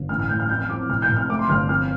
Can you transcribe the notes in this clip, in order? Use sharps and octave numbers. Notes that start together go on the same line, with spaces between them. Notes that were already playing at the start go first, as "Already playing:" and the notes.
Already playing: G1
A1 F6
F6
A1 G6
F6
F2 G6
F6
F2 D6
F1 F6
G6
F1
F6
A3 D6
C6
G1 F6
F2 F6